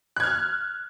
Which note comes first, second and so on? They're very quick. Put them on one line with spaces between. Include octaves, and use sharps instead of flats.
F#6 G#6 F6